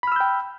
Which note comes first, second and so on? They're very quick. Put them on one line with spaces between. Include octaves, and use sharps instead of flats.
B5 F6 E6 G6 G5